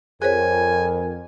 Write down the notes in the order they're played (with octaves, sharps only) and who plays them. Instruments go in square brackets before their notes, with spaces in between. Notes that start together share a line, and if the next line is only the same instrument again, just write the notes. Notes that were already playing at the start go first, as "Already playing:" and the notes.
[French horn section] F2 [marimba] G#4 C5 C#5 [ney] A#4 [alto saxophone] G#5